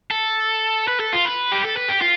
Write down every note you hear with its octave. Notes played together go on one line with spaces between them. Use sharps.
A4
B4
A4
F4
B4
G4
A4
B4
G4
F4